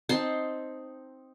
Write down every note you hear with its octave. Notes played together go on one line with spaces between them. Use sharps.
C4 D#4 A5 C6